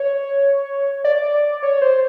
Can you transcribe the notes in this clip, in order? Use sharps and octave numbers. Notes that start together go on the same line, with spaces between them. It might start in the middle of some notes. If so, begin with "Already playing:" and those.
Already playing: C#5
D5
C#5
C5